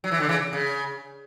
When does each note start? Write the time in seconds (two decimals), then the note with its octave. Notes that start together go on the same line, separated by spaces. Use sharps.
0.04 F#3
0.11 E3
0.20 D3
0.28 C#3 E3
0.53 C#3